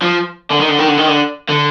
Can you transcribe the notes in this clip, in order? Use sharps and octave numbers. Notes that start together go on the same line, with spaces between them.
F3
D3
D#3
D3
D#3
D3
D#3
D3
D3